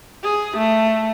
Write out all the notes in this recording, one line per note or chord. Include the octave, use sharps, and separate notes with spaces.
G#4
A3